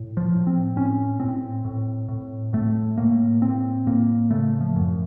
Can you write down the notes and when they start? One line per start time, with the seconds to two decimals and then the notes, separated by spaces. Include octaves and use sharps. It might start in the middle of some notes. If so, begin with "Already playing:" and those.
Already playing: A2
0.17 F3
0.32 A2
0.47 C4
0.76 A2 C#4
1.20 A2 C4
1.65 A2
2.08 A2
2.53 A2 A3
2.97 A2 A#3
3.41 A2 C4
3.87 A2 A#3
4.31 C#3 A3
4.61 F3
4.76 F#2